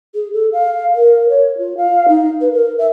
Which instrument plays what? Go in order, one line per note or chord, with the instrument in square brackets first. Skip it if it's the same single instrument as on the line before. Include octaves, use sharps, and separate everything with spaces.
[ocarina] G#4
A4
F5
A#4
C#5
F4
F5
D#4
B4
A#4
E5